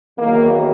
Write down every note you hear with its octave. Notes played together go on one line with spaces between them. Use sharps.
E2 D#3 F#3 A#3